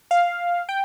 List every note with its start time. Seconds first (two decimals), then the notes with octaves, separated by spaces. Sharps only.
0.11 F5
0.69 G5